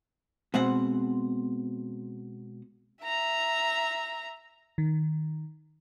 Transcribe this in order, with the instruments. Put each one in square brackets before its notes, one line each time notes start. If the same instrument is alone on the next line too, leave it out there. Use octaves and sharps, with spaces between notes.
[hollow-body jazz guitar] B2 G#3 C4 F#5
[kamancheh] E5 A#5
[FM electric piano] D#3